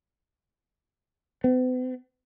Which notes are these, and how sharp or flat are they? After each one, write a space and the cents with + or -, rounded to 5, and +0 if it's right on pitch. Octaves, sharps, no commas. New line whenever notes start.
B3 +45